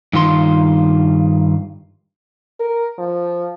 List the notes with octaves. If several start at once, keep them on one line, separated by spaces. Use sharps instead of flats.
G2 D#3 F4 C6
A#4
F3